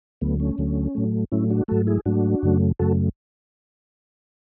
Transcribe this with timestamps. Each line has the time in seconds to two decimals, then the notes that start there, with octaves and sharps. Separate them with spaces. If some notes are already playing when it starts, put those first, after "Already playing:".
0.21 D2 D3 F#3 A3 B3
0.40 A3 C#4
0.58 D2 D3 F#3 A3
0.95 A2 F#3 A3
1.32 A2 F#3 A3 C#4 E4
1.50 D4 F#4
1.68 G#2 F#3 A3 F#4 A4
1.87 E4 G#4
2.06 G#2 F#3 A3 D4 F#4
2.43 F#2 C#3 F#3 A3
2.79 F#2 C#3 F#3 A3 F#4 A4